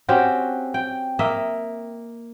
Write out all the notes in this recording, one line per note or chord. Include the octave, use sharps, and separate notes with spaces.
C4 C#4 F#4 G4
G5
A#3 D#5 E5